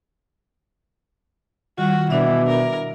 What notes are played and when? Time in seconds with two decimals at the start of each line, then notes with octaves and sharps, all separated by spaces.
1.78 D#3 G3 F4 F#4
2.10 B2 E3 D4 D5 E5
2.48 A#4